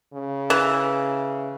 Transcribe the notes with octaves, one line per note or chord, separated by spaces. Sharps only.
C#3
E3